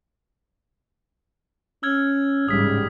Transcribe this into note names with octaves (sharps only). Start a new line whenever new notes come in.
C#4 E6 F6 G#6
A1 G#2 C#3 G3 D#6 B6